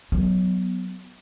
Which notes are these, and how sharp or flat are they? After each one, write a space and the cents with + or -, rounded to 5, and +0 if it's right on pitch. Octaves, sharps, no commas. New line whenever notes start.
F#3 +0 B3 +0